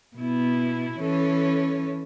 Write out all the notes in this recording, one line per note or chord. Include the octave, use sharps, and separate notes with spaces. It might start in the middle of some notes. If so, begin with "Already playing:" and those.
B2 B3 E4
E3 C#4 A4 C#5